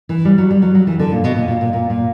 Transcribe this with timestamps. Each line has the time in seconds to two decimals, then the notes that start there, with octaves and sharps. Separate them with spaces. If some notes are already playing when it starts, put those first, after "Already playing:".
0.09 E3
0.25 G3
0.38 F#3
0.51 G3
0.62 F#3
0.75 F#3
0.87 E3
0.99 D3
1.12 A#2
1.24 B2
1.36 A#2
1.48 A#2
1.61 A#2
1.73 A#2
1.90 A#2